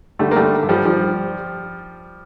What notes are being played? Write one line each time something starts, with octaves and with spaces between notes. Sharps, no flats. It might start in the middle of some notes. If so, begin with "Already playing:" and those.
D3 G3 A3
A#3
G3 A3
D3
G2
F3 G3
G2 F3 G3